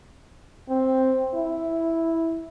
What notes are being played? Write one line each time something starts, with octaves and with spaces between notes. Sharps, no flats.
C4
E4